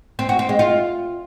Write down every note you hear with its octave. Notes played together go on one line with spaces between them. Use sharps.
C4
F#4
C4
G#3
F4